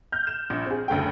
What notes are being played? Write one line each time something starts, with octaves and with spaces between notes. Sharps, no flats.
F6 G6
E7
A#1
C4 G#4
F#1 D2 A3 G5